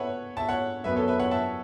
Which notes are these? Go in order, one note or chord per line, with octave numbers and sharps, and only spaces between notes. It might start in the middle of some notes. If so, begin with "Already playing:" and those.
Already playing: A4 B4 C#5 E5 F#5
E5 A5
C#5 F#5
F#2 F#3 B3 B4 E5
A4 C#5
B4 E5
C#5 F#5
E5 A5